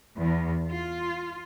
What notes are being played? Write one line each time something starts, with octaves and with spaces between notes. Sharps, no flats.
E2
F4